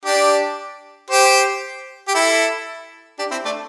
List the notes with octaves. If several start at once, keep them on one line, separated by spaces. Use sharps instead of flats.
D4 G4
G4 C5
G4
E4 A4
D4 G4
C4 E4
A3 D4